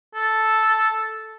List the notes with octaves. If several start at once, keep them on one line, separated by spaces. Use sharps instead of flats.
A4